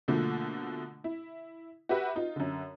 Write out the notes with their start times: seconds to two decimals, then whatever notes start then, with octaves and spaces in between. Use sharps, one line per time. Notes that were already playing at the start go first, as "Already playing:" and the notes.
0.08 B2 D3 F3 A3 A#3
1.04 E4
1.89 F#4 G4 B4 E5
2.16 D#4 F4
2.36 F#2 D3